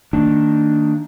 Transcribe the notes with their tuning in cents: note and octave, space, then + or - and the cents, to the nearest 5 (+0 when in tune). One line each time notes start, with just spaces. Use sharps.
D#3 +0 A#3 -40 D4 +0